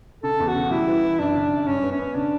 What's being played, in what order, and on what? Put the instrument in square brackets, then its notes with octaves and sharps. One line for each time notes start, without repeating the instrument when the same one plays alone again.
[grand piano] C#3 [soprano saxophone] A4
[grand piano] E2
[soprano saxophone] F#4
[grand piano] C#3
[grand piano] G3 [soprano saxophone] E4
[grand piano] E3
E3
[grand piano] F#2 [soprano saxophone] D4
[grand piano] C#3
F#2
[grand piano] G2 [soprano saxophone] C#4
[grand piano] B3
[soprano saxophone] C#4
[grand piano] B3
[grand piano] C#3 [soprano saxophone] D4